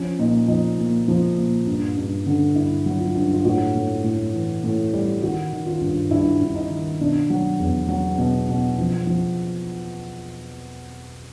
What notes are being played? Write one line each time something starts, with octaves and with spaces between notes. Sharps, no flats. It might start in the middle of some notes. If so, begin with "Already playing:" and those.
Already playing: F3 C#4
A#2 D#4
F3 D#4
A#2
F3
A#2
G2
G2
D3
G2 E4
F#3
F4
G2
F4
A2 F#4
A2
A2
E3
A2
G3
D#3 F#4
D#3
F4
G2
G2 E4
G2
D#4
D#3
B2 D4
F#3
E2
F#3
B2
B2
F3
F3